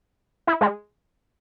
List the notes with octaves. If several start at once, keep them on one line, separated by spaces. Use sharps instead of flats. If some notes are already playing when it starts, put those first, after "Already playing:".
E4
G#3